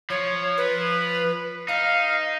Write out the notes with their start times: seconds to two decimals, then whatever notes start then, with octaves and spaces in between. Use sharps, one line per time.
0.10 F3 C#5
0.58 B4
1.68 D#4 F5